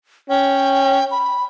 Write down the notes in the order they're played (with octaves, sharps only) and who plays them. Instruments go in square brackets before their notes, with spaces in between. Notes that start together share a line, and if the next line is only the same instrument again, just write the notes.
[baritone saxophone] C#4 [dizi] G5
[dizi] B5